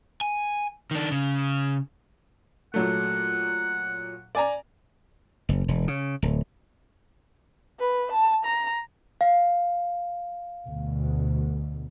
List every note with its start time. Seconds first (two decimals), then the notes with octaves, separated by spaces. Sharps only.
0.21 G#5
0.91 D#3 D4
1.12 C#3
2.74 A#2 F#3 A3 F#5
4.35 D5 G#5 A#5
5.49 F#1
5.68 E1
5.88 C#3
6.22 D1
7.79 B4
8.12 A5
8.45 A#5
9.21 F5
10.66 D2 B2